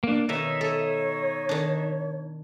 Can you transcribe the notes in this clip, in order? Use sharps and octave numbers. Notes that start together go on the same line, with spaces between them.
A#3 D4
B2 D#3 D#4 C#5 E5
A4
D#3 D4